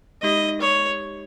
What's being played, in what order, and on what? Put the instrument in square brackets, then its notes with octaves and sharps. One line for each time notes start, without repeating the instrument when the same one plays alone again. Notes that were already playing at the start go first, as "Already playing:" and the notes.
[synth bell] G#3 D#4 G4 [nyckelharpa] D#5
[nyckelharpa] C#5